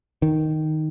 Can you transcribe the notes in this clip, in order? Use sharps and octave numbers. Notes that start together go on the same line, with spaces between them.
D#3